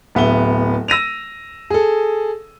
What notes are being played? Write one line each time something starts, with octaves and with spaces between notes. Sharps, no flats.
D1 B3 E5 G7
E6 A#6 D#7 F7
G#4 A4